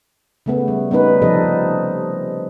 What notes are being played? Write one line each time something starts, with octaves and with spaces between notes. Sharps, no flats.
C#3 A3 B3
G3
G3 B3 C#4 D#4 B4
C3 F3 D#4 A4 D#5